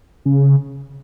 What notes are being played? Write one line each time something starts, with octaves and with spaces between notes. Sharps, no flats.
C#3